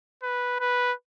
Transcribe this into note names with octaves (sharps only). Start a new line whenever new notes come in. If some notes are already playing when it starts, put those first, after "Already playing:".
B4
B4